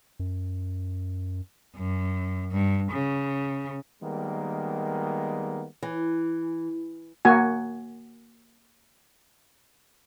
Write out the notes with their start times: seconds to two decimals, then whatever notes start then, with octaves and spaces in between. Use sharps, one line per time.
0.19 F#2
1.76 F#2
2.51 G2
2.92 C#3
4.02 D#3 G3 G#3 A#3 B3
5.82 E3
7.25 A#3 F#4 G#5